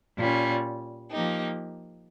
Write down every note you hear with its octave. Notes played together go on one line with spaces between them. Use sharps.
A#2 G3 C#4
F3 A#3 D#4 G4